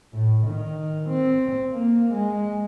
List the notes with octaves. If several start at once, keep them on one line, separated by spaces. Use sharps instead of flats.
A2
D#3
C4
A#3
G#3